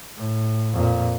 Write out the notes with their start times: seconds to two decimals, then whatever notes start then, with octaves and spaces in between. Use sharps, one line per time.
0.17 A2
0.74 F2 A#2